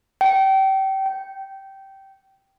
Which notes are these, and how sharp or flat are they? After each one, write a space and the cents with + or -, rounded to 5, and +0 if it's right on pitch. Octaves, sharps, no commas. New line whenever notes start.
G5 -30
G5 -15